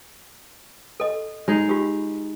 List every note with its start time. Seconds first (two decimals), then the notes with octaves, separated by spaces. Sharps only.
1.00 A4 D#5
1.48 G#3 D#4
1.69 F4 G4